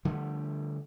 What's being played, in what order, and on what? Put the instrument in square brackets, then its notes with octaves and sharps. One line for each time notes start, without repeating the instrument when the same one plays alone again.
[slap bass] D3 F3 G3 A3